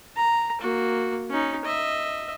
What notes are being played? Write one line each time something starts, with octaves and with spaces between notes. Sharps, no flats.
A#5
A#3 F#4
C#4 D#4
D#5 E5